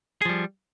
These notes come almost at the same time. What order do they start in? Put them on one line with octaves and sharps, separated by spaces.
G#4 F3 G3